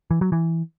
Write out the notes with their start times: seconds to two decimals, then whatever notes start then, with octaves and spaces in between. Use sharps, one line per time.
0.11 E3
0.21 F#3
0.32 E3